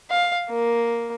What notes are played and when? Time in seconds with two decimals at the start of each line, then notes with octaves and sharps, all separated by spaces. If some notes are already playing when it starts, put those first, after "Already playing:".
0.10 F5
0.49 A#3